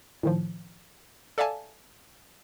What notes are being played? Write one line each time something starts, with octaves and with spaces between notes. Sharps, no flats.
A2 D#3 F3
A4 D5 E5 F5 G#5 A5